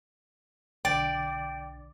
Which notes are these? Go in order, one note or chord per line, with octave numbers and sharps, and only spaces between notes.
B1 D3 D5 G5